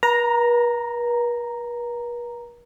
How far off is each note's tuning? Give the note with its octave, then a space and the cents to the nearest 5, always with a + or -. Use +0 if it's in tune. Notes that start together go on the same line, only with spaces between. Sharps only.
B4 -45 A#5 +0